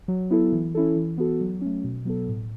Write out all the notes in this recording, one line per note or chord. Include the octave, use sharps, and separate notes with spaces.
F#3
B3 E4 A4
E3
C#4 E4 A4
E3
B3 F#4 A4
F#3
A3 C#4
B2
F#3 B3 A4
A2